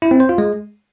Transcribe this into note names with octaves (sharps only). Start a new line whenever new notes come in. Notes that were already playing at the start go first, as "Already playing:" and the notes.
E4
C4
C5
F4
G#3